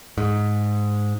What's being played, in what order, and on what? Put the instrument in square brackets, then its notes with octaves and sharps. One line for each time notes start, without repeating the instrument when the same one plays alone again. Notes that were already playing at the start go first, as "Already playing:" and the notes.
[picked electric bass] G#2